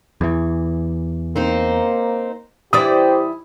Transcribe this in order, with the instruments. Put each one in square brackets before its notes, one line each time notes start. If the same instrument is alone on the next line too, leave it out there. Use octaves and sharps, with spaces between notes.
[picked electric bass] E2 E3
[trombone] A#3 [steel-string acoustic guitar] C4 D#4 C5
[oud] E3 E4 D5 [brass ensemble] G4 C5 [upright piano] D#6